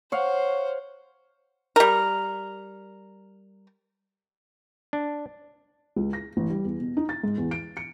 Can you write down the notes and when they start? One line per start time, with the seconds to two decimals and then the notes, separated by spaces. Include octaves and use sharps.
0.12 C5 C#5 F5 F#5
1.76 G3 A#4
4.93 D4
5.96 C#2
6.13 A#6
6.37 A1
6.50 G3
6.65 E2
6.80 B2
6.97 D#4
7.09 A6
7.24 G#2
7.37 E2
7.51 D7
7.77 C#7